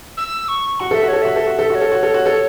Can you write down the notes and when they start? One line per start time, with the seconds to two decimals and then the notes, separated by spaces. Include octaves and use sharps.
0.17 E6
0.48 C#6
0.80 F#4 F#5
0.91 A4 E5
1.03 F#4
1.08 C#5
1.13 A4
1.22 F#4 E5
1.36 A4
1.47 F#4
1.59 A4
1.70 F#4 E5
1.75 C#5
1.81 A4
1.92 F#4
2.03 A4
2.14 F#4
2.26 A4